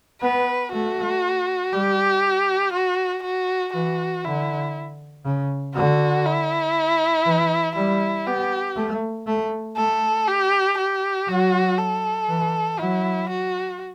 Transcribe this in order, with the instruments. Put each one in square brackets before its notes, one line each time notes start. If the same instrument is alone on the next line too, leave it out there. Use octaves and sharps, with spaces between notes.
[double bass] B3 [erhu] B4
[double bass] A3 [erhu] F#4
[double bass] G3 [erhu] G4
[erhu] F#4
F#4
[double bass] E3 [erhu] F#4
[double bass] D3 [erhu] E4
[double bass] C#3
[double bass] D3 [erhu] F#4
[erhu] E4
[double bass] E3
[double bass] G3 [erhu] E4
[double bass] B3 [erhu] G4
[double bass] A3
A3
[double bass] A3 [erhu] A4
[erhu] G4
G4
[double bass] F#3 [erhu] F#4
[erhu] A4
[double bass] E3
[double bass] F#3 [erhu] E4
[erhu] F#4